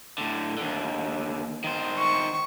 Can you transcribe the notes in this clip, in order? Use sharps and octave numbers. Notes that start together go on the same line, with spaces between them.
A2 D3
D#2 D3
D#3 C5
C#6